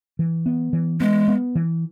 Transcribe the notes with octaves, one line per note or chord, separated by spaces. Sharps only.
E3
B3
E3
G#3 B3
B3
E3